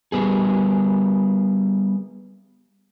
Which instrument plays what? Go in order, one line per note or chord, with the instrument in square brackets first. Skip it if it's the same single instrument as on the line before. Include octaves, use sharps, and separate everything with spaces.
[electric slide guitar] G3 B3 G#4